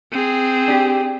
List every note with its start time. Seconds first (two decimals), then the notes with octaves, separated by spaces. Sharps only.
0.12 C4 G#4
0.68 D4 G4